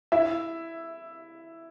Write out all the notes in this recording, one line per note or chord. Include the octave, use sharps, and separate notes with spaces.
E4 E5